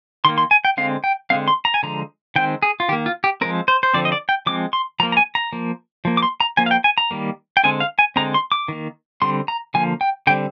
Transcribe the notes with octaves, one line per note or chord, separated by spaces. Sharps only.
D#3 A#3 C6
C6
G#5
G5
D3 G#3 C4 F5
G5
D3 G#3 C4 F5
C6
A#5
G#5
D3 F3 G#3 A#5
D#3 G#3 C4 G5
G#4
F4
D#3 A#3 G4
F4
G4
F3 G#3 C4 A#4
C5
C5
D3 F3 C4 D5
D#5
D5
G5
F3 G#3 C4 D6
C6
F3 A#3 A#5
A#5
G#5
A#5
F3 A#3
F3 A#3
D6
C6
A#5
F3 A#3 G#5
F5
G5
G#5
A#5
D#3 G3 A#3
G5
D3 G#3 C4 G#5
F5
G#5
D3 G#3 C4 A#5
C6
D6
D#3 A#3
D3 G3 C4 C6
A#5
D3 F3 A#3 G#5
G5
D3 G3 C4 G5